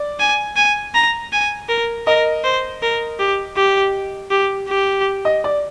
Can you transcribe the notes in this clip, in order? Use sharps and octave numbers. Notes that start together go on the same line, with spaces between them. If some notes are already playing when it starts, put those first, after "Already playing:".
Already playing: D5
G#5
G#5
A#5
G#5
A#4
A#4 D#5
C5
A#4
G4
G4
G4
G4
D#5
D5